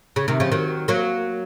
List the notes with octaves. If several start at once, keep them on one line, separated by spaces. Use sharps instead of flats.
C#3
C3 D#3
C#3 F3
D#3 F#3
F#3 A#3